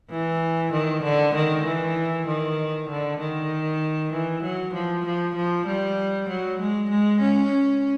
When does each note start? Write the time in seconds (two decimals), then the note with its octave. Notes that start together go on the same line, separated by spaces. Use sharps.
0.10 E3
0.72 D#3
1.03 D3
1.35 D#3
1.65 E3
2.27 D#3
2.89 D3
3.19 D#3
4.13 E3
4.43 F#3
4.74 F3
5.05 F3
5.35 F3
5.66 G3
6.29 F#3
6.60 G#3
6.90 G#3
7.21 C#4